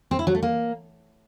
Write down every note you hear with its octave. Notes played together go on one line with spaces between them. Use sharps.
C4
E4
F#3
A3
A#3